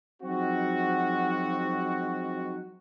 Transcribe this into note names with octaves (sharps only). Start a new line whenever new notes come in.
F3 F#3 G#3 C4 D#4 F#4